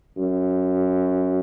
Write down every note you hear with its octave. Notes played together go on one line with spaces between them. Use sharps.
F#2